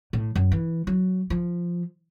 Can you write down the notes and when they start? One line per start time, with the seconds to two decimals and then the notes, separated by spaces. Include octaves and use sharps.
0.13 A2
0.35 F#2
0.52 E3
0.87 F#3
1.30 F3